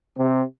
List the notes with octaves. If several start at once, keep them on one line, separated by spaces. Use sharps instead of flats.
C3